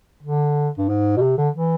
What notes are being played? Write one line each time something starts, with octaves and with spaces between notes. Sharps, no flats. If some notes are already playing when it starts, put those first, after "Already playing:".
D3
G2
G#2
B2
C3
D3
E3